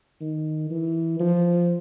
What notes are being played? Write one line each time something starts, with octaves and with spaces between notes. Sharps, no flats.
D#3
E3
F3